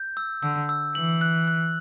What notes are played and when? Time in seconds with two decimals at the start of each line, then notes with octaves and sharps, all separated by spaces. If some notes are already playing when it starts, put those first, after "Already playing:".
Already playing: G6
0.17 E6
0.42 D3 E6
0.69 E6
0.95 E3 F#7
1.21 F#6
1.48 F#6